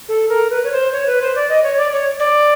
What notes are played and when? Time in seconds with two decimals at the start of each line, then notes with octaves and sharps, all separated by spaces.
0.09 A4
0.29 A#4
0.50 B4
0.64 C#5
0.72 C5
0.93 C#5
1.07 B4
1.22 C5
1.35 D5
1.49 D#5
1.63 C#5
1.78 D5
1.92 C#5
2.19 D5